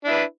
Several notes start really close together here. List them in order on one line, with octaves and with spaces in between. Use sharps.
D4 E4 B4